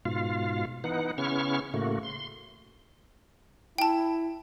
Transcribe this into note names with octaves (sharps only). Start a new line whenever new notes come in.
G#2 B2 F4 F5
E3 B3 D#4 F#5
C#3 B3 C#4 E4 C#6 F6
A2 C#3 A3 A#3 F#4
C6
E4 G5 A5